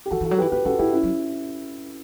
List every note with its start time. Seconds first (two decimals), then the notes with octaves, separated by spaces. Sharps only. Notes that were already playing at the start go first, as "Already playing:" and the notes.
0.06 G4
0.11 E3 F#4 A4
0.21 E3 F#4 A4
0.31 F#3
0.38 E3 G4 B4
0.52 B3 G4 B4
0.65 C#4 F#4 A4
0.78 B3 E4 G4
0.92 C#4 E4
1.03 F#3